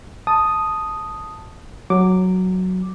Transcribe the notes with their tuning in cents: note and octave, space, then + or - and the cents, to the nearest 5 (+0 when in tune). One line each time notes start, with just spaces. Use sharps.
A5 +0 D#6 +0
F#3 +0 D6 +0